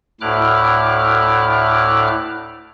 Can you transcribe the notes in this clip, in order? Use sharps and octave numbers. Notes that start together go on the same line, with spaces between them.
D2 A2 E4 D6 F6 F#6